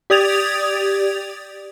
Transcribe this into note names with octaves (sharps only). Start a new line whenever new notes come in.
G4 D5 D#6 G#6 A6 F7